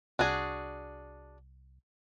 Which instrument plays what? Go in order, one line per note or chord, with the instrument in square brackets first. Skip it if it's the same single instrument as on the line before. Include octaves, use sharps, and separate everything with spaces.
[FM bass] C2 [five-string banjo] D4 F#4 G#4